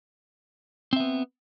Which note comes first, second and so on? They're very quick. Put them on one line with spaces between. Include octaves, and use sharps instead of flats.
C4 E5 B3